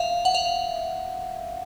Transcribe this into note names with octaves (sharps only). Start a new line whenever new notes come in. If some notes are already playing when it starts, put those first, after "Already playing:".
Already playing: E5 F5
F#5
F5